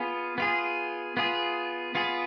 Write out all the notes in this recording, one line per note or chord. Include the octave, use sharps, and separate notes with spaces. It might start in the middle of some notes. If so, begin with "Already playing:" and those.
Already playing: B3 F4 G#4
B3 F4 G#4
B3 F4 G#4
B3 F4 G#4